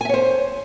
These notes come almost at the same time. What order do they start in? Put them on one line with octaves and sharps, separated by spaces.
G#5 E5 C#5 C5